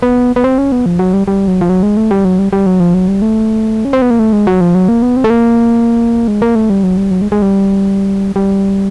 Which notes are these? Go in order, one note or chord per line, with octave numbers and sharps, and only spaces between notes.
B3
B3
C4
C#4
B3
F3
F#3
G3
G3
F#3
F3
F#3
G#3
A3
G3
F#3
G3
G3
F#3
F3
F#3
G3
A3
C#4
C4
B3
A#3
A3
G#3
F#3
F3
F#3
A#3
B3
C4
A3
A#3
G#3
A#3
A3
G3
F#3
G3
F#3
G#3
G#3
G3
G3